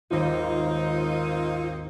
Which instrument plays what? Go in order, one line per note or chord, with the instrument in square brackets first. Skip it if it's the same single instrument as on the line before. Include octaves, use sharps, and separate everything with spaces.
[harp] G#1 D#2 A#6 [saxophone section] A#3 C4 D#4 [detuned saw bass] F4